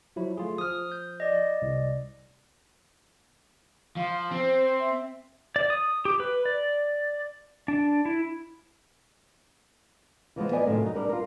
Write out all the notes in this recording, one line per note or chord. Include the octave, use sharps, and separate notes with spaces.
F3 F#3 E4
A3 F4 G#4
F3 D#6 F6
G6
D5 D#5
C2
F3 F5
C4 C5
E5
D5
D#6
G4
B4
D5
D4
E4
E3 F3 G#3 B3
B3 D5 D#5 G#5
F#2 A2 C3 D#3 A#3
F#3 D#4
G3 B3 D4 A#4
F4 A#4